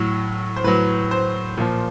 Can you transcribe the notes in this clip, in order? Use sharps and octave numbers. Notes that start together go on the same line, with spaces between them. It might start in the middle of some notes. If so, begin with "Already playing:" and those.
Already playing: A2 F#3
C5
A2 F#3 B4
C5
A#2 F3